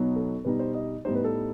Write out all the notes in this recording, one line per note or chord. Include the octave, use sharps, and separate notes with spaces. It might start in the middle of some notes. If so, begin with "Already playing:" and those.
Already playing: B2 F#3 B3 D#4
A4
B2 G3 D#4 B4
C5
D#5
A2 G3 B3 D#4 C5
B4
A4